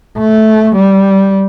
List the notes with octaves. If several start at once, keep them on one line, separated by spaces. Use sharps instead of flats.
A3
G3